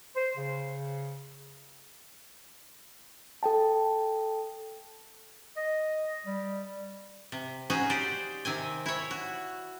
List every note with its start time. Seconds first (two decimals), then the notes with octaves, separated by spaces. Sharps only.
0.16 C5
0.37 C#3
3.43 A4 G5 A5
5.57 D#5
6.26 G3
7.32 C3
7.70 C#4 D#4 F#4 G#4
7.90 G4 C5 D5
8.45 C3 D#3 C4 G#5
8.86 E4 C#5
9.11 F#4